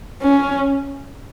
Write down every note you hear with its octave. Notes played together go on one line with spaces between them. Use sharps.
C#4